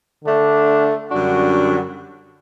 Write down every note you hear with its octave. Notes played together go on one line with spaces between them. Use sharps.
D3 A3 D4
F#2 D3 G3 D4 F#4